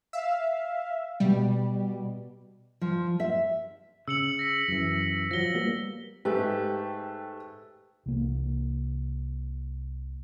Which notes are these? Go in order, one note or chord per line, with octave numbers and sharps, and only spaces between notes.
E5 F5
B2 G3
F3
E5
C#3 E6 C#7 F#7
A#6 B6
F#2 E3
F3 F#3 A#6 G7
G3 A#3 B3
G#2 A3 G4 B4
C2 A#3